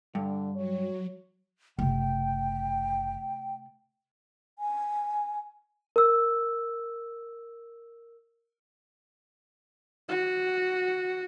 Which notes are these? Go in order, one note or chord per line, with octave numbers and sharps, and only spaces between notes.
G2 D3
F#3 C#5
F#1 C3 A3 G5
G#5
A#4 E6
F#4